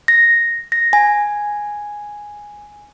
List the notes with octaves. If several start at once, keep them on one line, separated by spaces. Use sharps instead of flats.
A#6
A#6
G#5